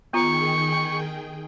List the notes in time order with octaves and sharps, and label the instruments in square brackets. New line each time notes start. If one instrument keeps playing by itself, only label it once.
[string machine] D#3 G#4 G5 [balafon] B3 F4 A#5 [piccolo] C#6